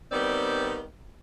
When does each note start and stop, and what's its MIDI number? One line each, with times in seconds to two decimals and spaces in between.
0.12 0.83 51
0.12 0.83 55
0.12 0.83 59
0.12 0.83 60
0.12 0.83 74